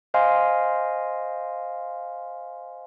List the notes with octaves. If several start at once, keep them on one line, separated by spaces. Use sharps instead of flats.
C5 D#5 F5 G#5 C6 F6